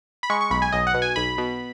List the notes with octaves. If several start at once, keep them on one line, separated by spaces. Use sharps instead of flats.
B5
G#3 C#6
C#6
B1 B5
G#5
B1 D#5
F#5
B2
G#5
B1 B5
B2